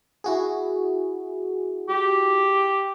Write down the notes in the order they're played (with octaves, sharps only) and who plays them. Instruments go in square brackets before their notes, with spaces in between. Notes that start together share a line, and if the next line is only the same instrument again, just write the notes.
[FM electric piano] E4 F#4 G#4
[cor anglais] G4